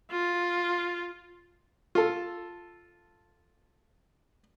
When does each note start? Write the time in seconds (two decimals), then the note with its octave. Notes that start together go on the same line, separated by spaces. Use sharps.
0.11 F4
1.95 F4 A4